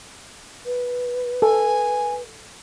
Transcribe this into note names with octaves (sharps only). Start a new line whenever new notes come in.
B4
A4 G#5